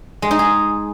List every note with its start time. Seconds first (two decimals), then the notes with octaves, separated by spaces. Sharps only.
0.22 G#3
0.31 D#4
0.39 G#4